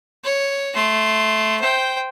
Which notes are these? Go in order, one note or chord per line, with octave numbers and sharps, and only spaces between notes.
C#5
A3 C6
C5 G5